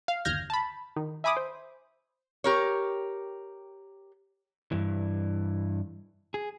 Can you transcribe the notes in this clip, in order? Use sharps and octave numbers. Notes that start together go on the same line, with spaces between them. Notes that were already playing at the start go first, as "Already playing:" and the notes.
F5
G1 D#2 F6 G6 G#6 A#6
A5 B5
D#3
E5 G#5 B5 D6 D#6
C5
G4 A#4 C#5
G2 E3
G#4